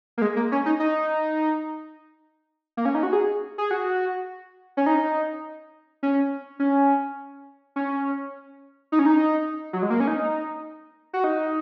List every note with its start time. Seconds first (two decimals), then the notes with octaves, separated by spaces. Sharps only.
0.17 A#3
0.22 G#3
0.36 A#3
0.52 C#4
0.66 D#4
0.80 D#4
2.77 A#3
2.85 C#4
2.95 D#4
3.03 F#4
3.13 G#4
3.58 G#4
3.71 F#4
4.77 C#4
4.86 D#4
6.03 C#4
6.59 C#4
7.76 C#4
8.92 D#4
8.99 C#4
9.06 D#4
9.73 F#3
9.82 G#3
9.90 A#3
10.00 C#4
10.07 D#4
11.13 F#4
11.24 D#4